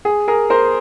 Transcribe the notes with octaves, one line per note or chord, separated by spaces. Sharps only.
G#4
G#4 A#4
A#4 C5